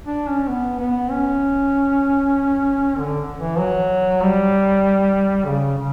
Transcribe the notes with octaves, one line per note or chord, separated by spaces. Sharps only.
D4
C#4
B3
B3
C#4
D3
E3
F#3
G3
C#3
C#3